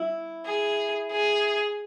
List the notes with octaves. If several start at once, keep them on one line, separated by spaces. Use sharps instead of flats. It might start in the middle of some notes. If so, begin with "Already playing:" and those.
Already playing: E4
G#4
G#4